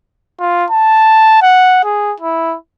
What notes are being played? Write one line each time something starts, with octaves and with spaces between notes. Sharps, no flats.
F4
A5
F#5
G#4
E4